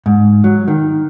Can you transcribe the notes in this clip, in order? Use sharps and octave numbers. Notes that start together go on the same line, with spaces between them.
G#2
F#3
D#3